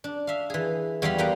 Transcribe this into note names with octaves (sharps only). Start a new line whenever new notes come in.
D4
E5 F5
E3 G#4
E2 G3 G#4 F5 B5 C6
A#3 B3 B4 F5 G5 A#5